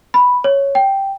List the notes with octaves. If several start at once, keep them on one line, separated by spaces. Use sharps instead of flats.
B5
C#5
G5